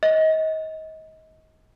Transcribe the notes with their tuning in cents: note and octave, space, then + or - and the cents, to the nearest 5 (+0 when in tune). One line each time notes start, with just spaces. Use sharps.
D#5 +30